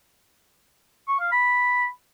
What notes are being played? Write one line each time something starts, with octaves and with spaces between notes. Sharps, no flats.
C#6
F5
B5